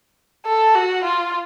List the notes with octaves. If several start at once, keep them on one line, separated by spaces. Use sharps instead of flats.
A4
F#4
F4